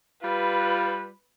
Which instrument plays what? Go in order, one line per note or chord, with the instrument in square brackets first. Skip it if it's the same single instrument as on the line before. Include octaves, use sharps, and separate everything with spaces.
[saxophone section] G3 F4 [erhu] B4